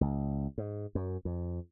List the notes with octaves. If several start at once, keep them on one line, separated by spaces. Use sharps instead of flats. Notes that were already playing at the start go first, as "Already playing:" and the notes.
C#2
G#2
F#2
F2